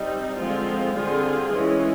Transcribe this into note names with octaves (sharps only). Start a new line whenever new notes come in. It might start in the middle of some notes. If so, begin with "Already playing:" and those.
Already playing: G3 C4 D#4
D3 F3 G#3 C4 F4
D3 G3 C4 F4 G#4
E3 G#3 C#4